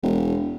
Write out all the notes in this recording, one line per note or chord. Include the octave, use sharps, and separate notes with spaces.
E1